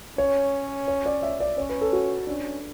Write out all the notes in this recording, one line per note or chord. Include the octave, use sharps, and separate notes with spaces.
C#4 C#5
C#5
D5
E5
D5
C#4 C#5
B4
A4
F#4
C#4 D4